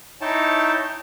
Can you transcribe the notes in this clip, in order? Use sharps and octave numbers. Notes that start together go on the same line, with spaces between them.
D#4 E4 C#5 G5 A5